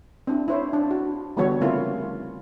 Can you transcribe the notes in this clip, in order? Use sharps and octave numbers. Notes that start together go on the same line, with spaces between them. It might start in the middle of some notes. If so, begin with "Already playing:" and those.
C4 D4 E4
E4 C5 C#5
D4
F#4
D3 E3 G3 B3 F#4 C#5
C#3 A3 C4 E4 F4 A#4